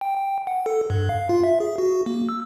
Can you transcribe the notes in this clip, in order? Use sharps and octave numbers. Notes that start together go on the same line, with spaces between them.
G5
G5
F#5
A4
G2
F5
F4
E5
G#4
F#4
A#3
E6